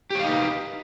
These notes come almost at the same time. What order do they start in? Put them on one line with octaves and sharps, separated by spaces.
G4 C#5 F5 D#4 B4